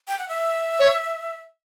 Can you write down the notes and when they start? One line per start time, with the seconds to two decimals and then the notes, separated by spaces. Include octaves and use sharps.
0.08 G5
0.19 F#5
0.29 E5
0.79 C#5